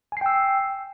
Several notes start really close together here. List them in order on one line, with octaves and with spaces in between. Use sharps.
G#5 C7 G5 E6